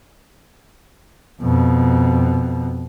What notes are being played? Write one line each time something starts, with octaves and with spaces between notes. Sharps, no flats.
F2 B2